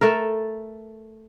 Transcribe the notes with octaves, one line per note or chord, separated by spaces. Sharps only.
A3 A4 A#4